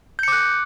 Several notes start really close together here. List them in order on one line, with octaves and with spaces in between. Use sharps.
G6 C#7 D6 F#6